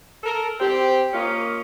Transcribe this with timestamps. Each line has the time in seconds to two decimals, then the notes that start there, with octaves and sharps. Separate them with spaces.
0.23 A4 A#4
0.60 C4 G4
1.13 A#3 C#4 F4 D#5